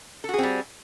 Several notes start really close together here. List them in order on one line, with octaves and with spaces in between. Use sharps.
A4 F#4 G#4 C4 G3